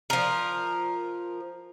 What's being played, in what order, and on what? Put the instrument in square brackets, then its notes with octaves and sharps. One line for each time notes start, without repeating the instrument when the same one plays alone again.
[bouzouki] F3 A#4